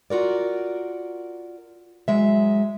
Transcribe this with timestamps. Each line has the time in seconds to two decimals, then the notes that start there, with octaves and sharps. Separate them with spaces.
0.10 F4 F#4 A#4 D5
2.08 F#3 G#3 E5